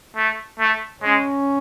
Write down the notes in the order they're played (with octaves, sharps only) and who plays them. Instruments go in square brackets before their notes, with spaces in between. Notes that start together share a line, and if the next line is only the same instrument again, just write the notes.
[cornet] A3
A3
[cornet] G#3 [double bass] C#4